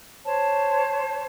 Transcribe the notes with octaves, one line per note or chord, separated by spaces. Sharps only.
C5 C#5 A5